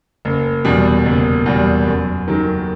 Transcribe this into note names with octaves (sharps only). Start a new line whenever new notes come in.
F#1
E2 B2 G3
F#1
E2 B2 G3
F#2
D#3 F#3